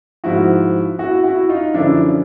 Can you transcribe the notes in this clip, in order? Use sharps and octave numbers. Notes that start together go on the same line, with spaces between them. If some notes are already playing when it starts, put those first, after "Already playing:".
G#2 F3 E4 F#4
E4 F#4
E4 F#4
D#4 F4
F#2 D3 F3 D4 E4